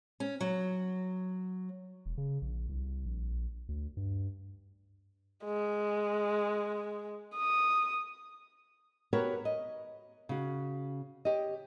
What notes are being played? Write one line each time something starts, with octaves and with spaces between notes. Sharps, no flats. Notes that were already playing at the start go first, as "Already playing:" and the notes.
C#4
F#3
E1
C#3
A#1
C2
A#1
D2
G2
G#3
D#6
B3 F#4 G4 A#4 B4 C#5
D#5
C#3 F#4
G4 C#5 D#5